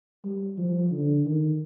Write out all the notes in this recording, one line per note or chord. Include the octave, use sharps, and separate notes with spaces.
G3
F3
D3
D#3